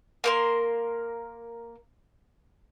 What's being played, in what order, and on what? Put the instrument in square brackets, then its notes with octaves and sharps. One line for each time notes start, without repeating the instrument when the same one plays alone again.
[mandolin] A#3 A#4 C6